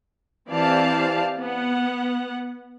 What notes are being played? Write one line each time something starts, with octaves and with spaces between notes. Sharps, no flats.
E3 C4 G4 D5 F5 A5
B3 F#5